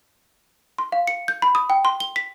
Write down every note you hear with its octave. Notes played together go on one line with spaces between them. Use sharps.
C6
F5
C#7
G6
B5
D#6
G5
C6
G7
B6